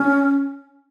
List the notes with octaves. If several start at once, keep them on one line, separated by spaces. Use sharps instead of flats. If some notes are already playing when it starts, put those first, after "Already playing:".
Already playing: C#4